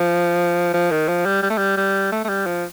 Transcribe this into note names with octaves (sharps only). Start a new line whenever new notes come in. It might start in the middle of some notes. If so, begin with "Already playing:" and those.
Already playing: F3
F3
D#3
F3
G3
G3
A3
G3
G3
A3
A3
G3
F3